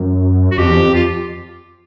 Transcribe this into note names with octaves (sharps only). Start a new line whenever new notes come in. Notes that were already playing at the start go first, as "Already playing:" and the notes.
Already playing: F#2
F#4
F2 G4
E2
F2
F4